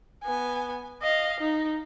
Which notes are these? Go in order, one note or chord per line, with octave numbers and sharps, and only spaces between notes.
B3 G#5
D#5 F5
D#4